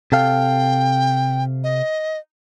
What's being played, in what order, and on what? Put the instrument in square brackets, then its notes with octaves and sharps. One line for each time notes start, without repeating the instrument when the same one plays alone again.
[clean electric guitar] C3 A4 F5 [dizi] G5
[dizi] D#5